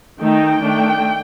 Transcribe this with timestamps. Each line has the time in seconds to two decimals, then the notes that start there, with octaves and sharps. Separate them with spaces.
0.20 D#3 A3 D#4 G5
0.61 D#3 A3 D4